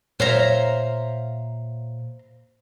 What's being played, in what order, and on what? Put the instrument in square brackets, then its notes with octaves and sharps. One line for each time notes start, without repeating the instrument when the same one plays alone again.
[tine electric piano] A#2 [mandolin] C5 F5 A#5 [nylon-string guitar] C#5 E5